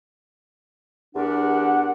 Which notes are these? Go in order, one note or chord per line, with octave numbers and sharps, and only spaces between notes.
E2 D4 G4 A#4 F#5